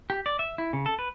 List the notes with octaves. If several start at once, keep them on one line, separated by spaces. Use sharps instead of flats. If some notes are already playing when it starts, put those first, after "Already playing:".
G4
D5
E5
E4
C#3
A4
B4